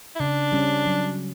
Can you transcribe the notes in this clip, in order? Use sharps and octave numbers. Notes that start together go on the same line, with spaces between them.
E4
C#3 D4
G3 C#4
F#3